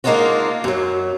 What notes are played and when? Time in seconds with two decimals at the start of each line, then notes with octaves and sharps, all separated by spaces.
0.04 G#3 A#3 D4 D#4 F4 F#4
0.64 F#2 F#3